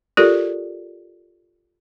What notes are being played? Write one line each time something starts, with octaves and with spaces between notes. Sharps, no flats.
F4 G4 A4 A#4 D5